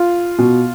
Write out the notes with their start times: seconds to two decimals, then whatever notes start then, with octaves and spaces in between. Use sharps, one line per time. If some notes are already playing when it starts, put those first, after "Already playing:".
Already playing: F4
0.39 B2